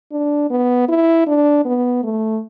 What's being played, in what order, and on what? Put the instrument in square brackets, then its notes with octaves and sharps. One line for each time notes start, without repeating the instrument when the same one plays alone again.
[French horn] D4
B3
E4
D4
B3
A3